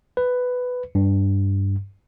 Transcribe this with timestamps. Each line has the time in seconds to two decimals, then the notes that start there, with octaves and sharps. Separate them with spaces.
0.17 B4
0.95 G2